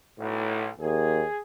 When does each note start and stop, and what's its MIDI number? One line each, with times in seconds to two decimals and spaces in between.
0.19 0.70 35
0.19 0.69 45
0.80 1.23 39
0.80 1.40 68